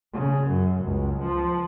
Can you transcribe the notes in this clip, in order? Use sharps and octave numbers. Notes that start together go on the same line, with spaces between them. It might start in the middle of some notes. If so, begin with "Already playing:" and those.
C#3
F#2
C#2
F3